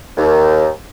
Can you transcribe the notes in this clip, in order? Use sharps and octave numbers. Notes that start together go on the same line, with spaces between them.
D#2